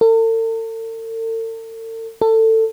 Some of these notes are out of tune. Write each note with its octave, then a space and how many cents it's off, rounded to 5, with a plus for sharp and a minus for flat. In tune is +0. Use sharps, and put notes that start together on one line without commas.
A4 +45
A4 +20